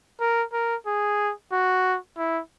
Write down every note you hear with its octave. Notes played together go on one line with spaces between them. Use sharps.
A#4
A#4
G#4
F#4
E4